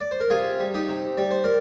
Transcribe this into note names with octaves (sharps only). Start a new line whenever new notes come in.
D5
C5
A#4
C3 F4 G#4
G3
D#4 G4
C3
G3 D5
C5
A#4 D5